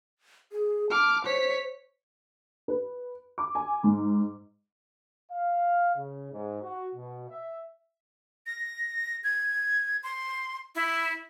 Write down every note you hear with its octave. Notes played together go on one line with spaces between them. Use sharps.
G#4
A5 D6 F6
C5 C#5 B6
B4
D6
G#5
G#2
F5
C#3
G#2
F#4
B2
E5
A#6
G#6
C6
E4